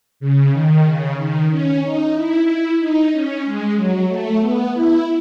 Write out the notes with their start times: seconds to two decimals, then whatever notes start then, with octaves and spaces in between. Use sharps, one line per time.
0.20 C#3
0.52 D#3
0.85 C#3
1.17 D#3
1.50 C#4
1.82 D#4
2.14 E4
2.79 D#4
3.12 C#4
3.44 G#3
3.76 F#3
4.08 A3
4.40 B3
4.74 E4